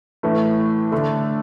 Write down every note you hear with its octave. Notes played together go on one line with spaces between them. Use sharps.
A2 E3 A3
D3 A3 D4 A4